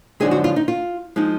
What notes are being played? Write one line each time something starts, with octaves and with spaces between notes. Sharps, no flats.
F#2 D3 F3 G#3 D#4 G#4
F#4
F4
D#4
F4
F3 G#3 D#4